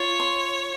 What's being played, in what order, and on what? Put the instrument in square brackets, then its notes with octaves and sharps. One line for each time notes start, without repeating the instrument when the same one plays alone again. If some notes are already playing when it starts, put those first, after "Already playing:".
Already playing: [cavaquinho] F4 [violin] C#5
[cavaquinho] C6